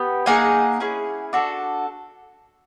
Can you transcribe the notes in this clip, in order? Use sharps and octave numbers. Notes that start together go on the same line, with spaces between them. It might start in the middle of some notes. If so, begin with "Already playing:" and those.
Already playing: B3 G4
A#3 D#4 G#4 F#5 G#5
C#4 E4 G#4
D4 F#4 A4